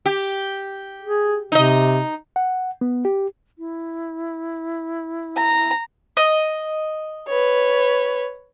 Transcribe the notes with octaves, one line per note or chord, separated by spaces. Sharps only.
G4
G#4
C3 D#4 D#5
F#5
B3
G4
E4
A#5
D#5
B4 C#5